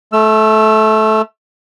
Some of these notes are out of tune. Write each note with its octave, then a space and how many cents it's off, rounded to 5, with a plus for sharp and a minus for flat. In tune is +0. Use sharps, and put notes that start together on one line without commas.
A3 -20 E6 +25